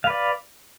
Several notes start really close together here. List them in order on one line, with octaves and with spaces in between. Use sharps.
F5 B4 D5